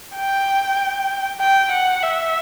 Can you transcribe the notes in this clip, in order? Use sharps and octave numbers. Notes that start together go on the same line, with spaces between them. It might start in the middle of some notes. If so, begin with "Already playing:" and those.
G5
G5
F#5
E5